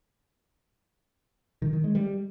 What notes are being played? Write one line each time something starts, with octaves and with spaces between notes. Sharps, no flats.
D#3
D#3
G#3
G3